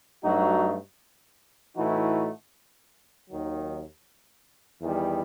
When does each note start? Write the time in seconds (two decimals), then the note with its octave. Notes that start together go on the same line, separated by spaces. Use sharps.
0.23 G2 F#3 A3 D#4 F#4
1.76 A2 E3 A3 D#4 F#4
3.28 D#2 D#3 F#3
4.81 E2 D#3 G3